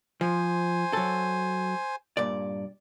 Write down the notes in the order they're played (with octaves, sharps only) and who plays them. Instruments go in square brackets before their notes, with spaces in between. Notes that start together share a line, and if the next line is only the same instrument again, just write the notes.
[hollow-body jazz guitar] F3 [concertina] C5 G#5
[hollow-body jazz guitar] F#3 A4
G2 A#2 D5